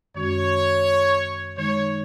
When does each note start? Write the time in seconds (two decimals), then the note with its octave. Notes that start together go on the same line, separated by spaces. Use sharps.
0.15 F#2 D#3 G#3 C#4 F#4 C#5
1.57 D#3 G#3 D#4 C#5